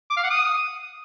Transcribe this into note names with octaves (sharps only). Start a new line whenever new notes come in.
D6
F5
F#5
D#6